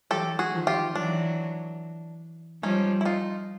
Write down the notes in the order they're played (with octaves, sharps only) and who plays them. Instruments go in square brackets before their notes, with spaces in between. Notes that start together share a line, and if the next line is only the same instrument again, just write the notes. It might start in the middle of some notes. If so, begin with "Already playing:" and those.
[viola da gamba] E3 F#3 [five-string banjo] G4 A4
[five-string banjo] F#4 G#4
[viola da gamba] D#3 F3
[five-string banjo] F4 G4
[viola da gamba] E3 F#3 [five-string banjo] D4
[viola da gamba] F3 G3 [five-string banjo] C#4 D#4
[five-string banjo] E4
D#4 F4